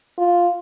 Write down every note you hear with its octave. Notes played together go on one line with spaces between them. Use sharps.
F4